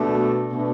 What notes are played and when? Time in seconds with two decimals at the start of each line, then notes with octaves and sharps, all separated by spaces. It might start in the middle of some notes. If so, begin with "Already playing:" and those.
Already playing: B2 A3 D4
0.53 B2 A3 D4